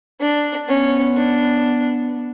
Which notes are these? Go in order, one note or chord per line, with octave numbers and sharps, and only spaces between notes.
D4
B3 C#4
D4